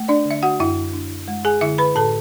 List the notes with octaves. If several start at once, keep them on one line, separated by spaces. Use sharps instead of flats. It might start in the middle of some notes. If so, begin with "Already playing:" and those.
Already playing: A3
D4 D5
D3
E5
F#4 F#5
F#2 E4 E5
D4
G#3
G#4 G#5
D3 E4 E5
B4 B5
A2 A4 A5